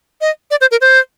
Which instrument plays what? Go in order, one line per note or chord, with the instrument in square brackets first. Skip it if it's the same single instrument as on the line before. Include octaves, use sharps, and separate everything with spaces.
[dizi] D#5
D5
C5
A#4
C5